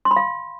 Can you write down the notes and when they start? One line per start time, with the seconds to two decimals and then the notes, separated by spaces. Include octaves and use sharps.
0.05 C6
0.11 B5
0.16 F5